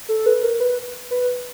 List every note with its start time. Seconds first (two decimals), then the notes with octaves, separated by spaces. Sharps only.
0.09 A4
0.26 B4
0.43 A#4
0.60 B4
1.11 B4